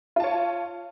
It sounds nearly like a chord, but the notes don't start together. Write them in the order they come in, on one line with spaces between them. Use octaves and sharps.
F4 A5 C#5